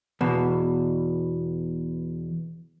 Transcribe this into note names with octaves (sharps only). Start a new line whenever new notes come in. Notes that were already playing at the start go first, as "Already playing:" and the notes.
E2 B2